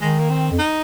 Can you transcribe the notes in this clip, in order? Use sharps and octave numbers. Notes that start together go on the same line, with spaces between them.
D#3 G#3
A#3
C4
F2
D#4